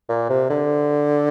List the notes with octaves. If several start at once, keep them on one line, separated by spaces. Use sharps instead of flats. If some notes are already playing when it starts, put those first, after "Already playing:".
A#2
C3
D3